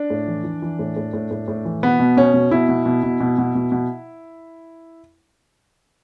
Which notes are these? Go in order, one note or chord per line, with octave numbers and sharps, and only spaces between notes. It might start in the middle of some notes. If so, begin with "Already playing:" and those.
Already playing: D4
A2
E3
E3
E3
A2
A2
A2
A2
A2
E3
B2 B3
B2
B2 C#4
B2
B2 E4
B2
B2
B2
B2
B2
B2
B2